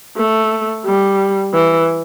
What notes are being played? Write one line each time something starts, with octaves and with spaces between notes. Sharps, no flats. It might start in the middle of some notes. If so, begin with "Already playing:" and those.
A3
G3
E3